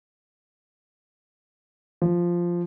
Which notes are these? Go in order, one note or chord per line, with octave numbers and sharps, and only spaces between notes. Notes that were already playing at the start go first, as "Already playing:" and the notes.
F3